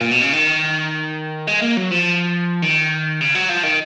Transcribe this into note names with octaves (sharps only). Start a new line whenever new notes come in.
A#2
B2
C#3
D#3
G#3
A#3
F#3
F3
D#3
C#3
F#3
F3
D#3